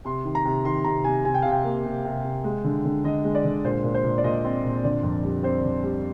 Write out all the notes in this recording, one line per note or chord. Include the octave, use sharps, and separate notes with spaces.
C3 C6
D#3
A#5
C3
D#3 C6
C3 A#5
C3 G#5
C3 G#5
G5
C3 F5
G5
A#3
C3
C3
C3
G#3
D3
D3
D3 D#5
G#3
D5
D3
A#2 C5
A#2
C5
A#2
D5
A#2 D#5
C4
A#2
D3 D5
F2
G3
C4 C5
D3
G3